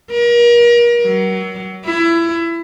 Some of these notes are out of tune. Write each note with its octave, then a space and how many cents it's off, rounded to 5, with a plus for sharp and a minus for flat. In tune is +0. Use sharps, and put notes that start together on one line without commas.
A#4 +35
F#3 +30
E4 +25